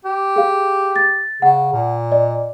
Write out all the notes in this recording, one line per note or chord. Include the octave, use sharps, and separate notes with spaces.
G4
G#4 F5
A6
C#3 F#5
A#2
D5 D#5